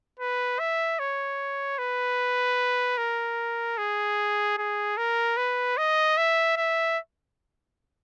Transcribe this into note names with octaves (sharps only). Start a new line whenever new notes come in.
B4
E5
C#5
B4
A#4
G#4
G#4
A#4
B4
D#5
E5
E5